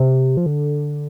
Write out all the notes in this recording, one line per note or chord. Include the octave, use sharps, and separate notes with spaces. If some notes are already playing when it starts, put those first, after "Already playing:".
Already playing: C3
F3
D3